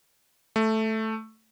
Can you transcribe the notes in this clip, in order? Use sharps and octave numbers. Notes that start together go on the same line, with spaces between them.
A3